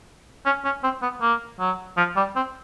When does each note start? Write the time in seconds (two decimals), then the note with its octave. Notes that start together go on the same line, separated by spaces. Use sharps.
0.45 C#4
0.64 C#4
0.83 C4
1.02 B3
1.21 A#3
1.59 F#3
1.97 F3
2.16 G3
2.36 C4